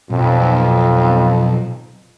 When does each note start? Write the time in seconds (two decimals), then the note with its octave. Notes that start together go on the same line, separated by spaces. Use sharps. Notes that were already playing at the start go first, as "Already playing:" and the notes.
0.10 B1 F2